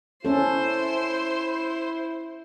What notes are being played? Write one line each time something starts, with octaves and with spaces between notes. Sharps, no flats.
C#4 E4 A4 C5